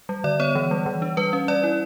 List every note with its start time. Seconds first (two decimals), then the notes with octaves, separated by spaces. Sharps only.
0.09 G3
0.24 D3 D5
0.40 B3 C#5
0.55 E3
0.71 G3
0.86 E3
1.02 D4
1.17 G3 B4
1.33 C#4
1.48 G3 D5
1.64 E4